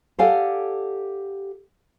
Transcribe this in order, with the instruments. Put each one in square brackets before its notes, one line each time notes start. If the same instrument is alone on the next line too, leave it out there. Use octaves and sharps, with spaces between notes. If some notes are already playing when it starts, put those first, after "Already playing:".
[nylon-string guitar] G4 A4 D5 F5 F#5 G#5